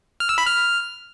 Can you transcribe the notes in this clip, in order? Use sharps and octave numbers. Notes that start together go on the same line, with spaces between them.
F6
E6
B5
F6